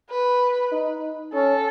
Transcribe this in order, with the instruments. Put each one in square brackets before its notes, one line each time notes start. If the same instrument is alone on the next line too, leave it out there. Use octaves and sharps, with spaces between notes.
[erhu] B4
[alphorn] D#4
[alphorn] C#4 [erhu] A4